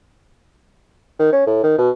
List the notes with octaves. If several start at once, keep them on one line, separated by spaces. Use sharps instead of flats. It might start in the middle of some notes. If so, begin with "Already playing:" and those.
D#3
C#4
A2
D#3
B2